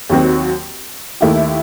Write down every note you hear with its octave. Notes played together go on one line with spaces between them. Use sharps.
D#2 D#3 F#3 C4 F#4
D#2 D#3 A3 E4 G4